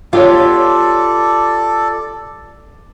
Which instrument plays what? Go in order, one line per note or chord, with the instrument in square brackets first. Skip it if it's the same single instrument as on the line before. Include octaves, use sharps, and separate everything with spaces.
[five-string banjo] B3 G4 C#5 [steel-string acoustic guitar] F4 F5 [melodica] A4 D5